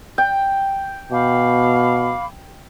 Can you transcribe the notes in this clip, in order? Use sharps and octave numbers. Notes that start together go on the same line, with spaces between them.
G5
B2 F5 B5 D6